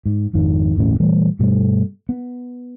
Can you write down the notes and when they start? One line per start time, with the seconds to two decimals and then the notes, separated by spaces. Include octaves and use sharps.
0.06 G#2
0.33 G#1 F2 G#2 D#3
0.76 G1 E2 A2 C#4
1.00 A#2 E3 G3 A3
1.39 G2 B2 G3 A3
2.09 B3